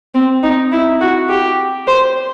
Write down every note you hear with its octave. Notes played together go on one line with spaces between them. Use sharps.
C4
D#4
E4
F#4
G4
C5